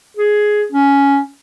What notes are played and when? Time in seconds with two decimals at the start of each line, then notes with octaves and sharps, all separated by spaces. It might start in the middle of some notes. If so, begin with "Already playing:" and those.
0.17 G#4
0.72 C#4